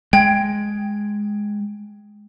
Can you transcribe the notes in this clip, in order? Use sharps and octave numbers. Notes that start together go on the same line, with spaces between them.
G#3 G5 G#6 D7